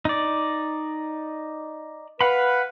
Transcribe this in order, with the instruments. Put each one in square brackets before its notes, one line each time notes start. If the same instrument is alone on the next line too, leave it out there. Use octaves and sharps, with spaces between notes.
[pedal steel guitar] D#4 D5
[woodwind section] B4 [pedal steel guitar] F5 F#5 B5